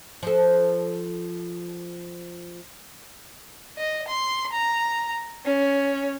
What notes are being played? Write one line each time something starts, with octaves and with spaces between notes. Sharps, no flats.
F3 A4
D#5
C6
A#5
C#4